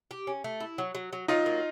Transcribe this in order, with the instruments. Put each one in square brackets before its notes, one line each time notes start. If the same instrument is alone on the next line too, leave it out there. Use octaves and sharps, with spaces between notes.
[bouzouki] G4
C#4
A3
E4
F#3
F#3
F#3
[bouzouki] F#3 [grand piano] D#4 F4
[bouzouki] A#3